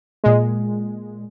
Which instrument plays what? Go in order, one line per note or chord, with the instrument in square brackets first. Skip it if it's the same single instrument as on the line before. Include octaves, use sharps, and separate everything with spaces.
[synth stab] A#2 G#3